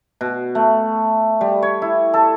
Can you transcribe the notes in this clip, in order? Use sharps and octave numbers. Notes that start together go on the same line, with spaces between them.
B2
A3
G3
C#5
E4
A4